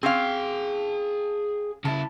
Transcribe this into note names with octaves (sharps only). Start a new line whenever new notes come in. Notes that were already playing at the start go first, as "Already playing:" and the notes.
C4 C#4 G#4 F5 G5
C#3 E4 A5